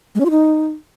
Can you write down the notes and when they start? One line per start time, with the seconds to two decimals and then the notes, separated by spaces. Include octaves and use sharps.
0.15 G#3
0.20 C#4
0.25 F4
0.31 D#4